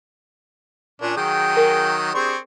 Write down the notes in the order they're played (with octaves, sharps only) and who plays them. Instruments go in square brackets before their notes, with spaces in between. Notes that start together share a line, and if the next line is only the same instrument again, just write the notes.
[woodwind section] A#2 [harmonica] C#4 D4
[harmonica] D#3 F#3 D#6 [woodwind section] G#4 G5
[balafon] A#4
[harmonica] C4 C5 C#6 [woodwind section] D4 G4 G#4